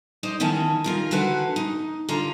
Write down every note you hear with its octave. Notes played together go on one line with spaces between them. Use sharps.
D#4 C5 D5 D#5
E2 D#3 E3 C#4 A5
D#3 F4 A#4
D3 E3 F#4 B4 C5
D#4
D3 F4 A#5